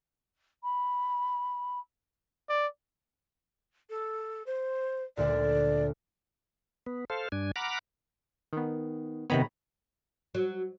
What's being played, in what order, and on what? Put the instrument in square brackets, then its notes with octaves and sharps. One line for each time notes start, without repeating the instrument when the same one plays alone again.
[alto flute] B5
[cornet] D5
[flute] A4
C5
[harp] D2 A#2 [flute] D5
[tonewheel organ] B3
A4 C5 F5
G2 D4 G#5
F#5 A#5 B5 D6 F6
[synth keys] D#3 B3
[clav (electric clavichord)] C3 D#3 B3 [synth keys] C#5 A#5 B5
[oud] F#3